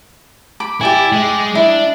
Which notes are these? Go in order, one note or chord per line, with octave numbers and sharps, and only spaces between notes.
B5 D6
E4 G4 D5 G#5
G#3
D4 E4